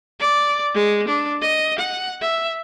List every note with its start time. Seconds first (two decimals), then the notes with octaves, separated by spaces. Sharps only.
0.20 D5
0.74 G#3
1.08 D4
1.42 D#5
1.79 F#5
2.22 E5